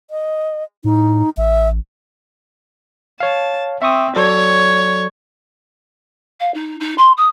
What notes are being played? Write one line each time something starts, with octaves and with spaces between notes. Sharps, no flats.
D#5
A2 D#4
A1 E5
C#5 F5 A5
C4 E5 C#6 D#6
F#3 A4 C#5 D5
F5
D#4
D#4
C6
D#6